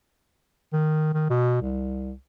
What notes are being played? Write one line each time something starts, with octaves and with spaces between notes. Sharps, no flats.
D#3
D#3
B2
C2